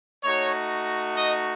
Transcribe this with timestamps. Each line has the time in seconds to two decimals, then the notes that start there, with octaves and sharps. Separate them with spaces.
0.24 A3 D#4 F#4 C#5
1.17 D#5